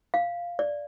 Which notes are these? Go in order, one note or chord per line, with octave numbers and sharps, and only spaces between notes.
F5
D5